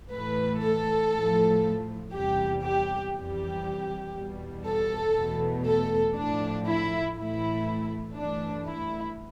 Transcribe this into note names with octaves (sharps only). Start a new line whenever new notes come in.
A2 E3 A3 B4
A4
A2 F3 A3
E2 C3 G3 G4
G4
F2 C3 E3 G3 G4
E2 B2 G3
A4
E2 B2 A3
A4
A2 F3 A3 D4
E4
A2 E3 A3 E4
G2 E3 A3 D4
E4